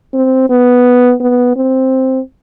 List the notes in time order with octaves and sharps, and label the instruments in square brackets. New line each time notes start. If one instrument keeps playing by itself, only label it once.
[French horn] C4
B3
B3
C4